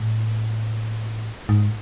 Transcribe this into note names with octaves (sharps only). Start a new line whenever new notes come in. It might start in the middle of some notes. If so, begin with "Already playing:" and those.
Already playing: A2
G#2